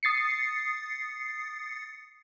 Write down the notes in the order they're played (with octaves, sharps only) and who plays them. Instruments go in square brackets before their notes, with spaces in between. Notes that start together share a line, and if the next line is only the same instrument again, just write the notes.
[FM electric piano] D#6 A6 C7 C#7